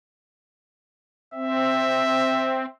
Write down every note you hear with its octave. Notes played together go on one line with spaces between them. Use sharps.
C4 E5